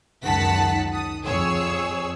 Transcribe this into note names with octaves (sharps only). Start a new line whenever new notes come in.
C#2 F#2 D#3 F#5 A5 B6
D#6
F2 G#4 C#5 E6